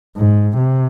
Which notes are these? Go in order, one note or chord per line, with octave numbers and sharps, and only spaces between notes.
G#2
C3